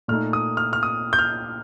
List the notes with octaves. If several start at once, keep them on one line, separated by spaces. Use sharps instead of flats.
A#2 A3 D#4 F6
D#6
F6
F6
D#6
G6
F6